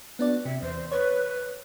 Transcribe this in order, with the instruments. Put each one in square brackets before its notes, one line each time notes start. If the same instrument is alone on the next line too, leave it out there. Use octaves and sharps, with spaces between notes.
[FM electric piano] B3 D4 D5 [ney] F#4
[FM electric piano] C3 [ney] E5
[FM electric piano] E2 [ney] C5
[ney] B4 [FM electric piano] C#5